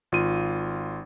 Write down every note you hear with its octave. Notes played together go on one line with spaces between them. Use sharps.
G#1 F4 D#7